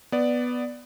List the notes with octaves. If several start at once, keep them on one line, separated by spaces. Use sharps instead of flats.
B3 D5